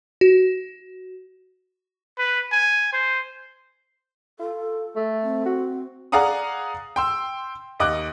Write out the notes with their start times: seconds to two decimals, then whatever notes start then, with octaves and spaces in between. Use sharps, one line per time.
0.21 F#4
2.19 B4
2.52 G#5
2.93 C5
4.39 F4 A4
4.96 A3
5.23 C4
5.45 F#4
6.12 G#4 D5 F5 F#5 A#5 D#6
6.96 G5 C6 E6
7.80 D#2 D#5 D6 F#6